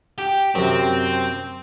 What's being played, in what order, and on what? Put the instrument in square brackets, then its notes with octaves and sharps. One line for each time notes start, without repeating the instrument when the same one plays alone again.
[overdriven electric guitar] G4
[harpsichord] F#2 C3 [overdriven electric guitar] C4